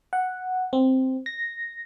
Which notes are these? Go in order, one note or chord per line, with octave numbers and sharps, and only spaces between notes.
F#5
C4
A#6